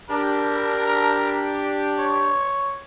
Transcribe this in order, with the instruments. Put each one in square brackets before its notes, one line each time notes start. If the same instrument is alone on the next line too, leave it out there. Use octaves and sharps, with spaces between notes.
[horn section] D4 G4 [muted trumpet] A#4
[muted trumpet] C#5